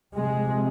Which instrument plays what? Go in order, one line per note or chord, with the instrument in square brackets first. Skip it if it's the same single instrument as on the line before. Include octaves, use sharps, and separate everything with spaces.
[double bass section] F2 C3 G#3